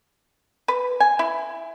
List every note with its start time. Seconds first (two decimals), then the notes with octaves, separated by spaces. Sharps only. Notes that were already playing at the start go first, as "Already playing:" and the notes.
0.68 B4
1.00 G#5
1.19 E4